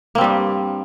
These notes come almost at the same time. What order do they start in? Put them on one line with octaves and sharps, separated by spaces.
A#3 C4 G3 G2